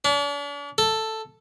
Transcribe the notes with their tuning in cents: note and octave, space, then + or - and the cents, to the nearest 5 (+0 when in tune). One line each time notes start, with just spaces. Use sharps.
D4 -45
A4 +5